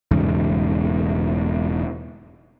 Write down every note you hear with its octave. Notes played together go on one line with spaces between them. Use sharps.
E1 E2 G#2 C#3